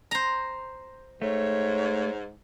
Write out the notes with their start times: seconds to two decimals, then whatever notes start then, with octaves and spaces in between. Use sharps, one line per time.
0.11 C5 A#5
1.22 G#2 A3 C#5